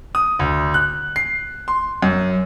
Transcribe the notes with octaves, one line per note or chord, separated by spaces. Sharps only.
D#6
D2
F#6
C7
C6
F#2